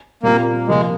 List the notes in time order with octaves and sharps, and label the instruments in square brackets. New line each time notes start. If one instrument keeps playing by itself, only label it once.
[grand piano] A#2 G3 C4 F4 [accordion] A#3
[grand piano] C3 F3 A#3 F4 [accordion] G#3